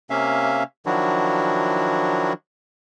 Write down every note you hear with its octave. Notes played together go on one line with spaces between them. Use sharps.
C3 A#3 C#4 E5 F5
D#3 F3 F#3 D4 E4 F#4